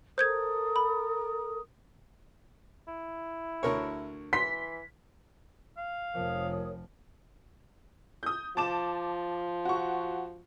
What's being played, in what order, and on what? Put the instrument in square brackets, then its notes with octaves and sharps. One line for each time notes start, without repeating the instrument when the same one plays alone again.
[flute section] A4 A#4 D#6 [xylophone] C5 G6 G#6
[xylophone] B5
[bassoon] E4
[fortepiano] D2 A#4 C#5
[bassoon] E3 [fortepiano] C6 [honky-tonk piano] B6
[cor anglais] F5
[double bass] F1 F3 [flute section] A#4 C#5 D#6
[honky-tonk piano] D#6 G6
[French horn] F3 [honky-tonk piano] A5 D6 E7
[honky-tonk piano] F#4 C#6